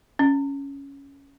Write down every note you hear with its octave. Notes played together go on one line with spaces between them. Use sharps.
C#4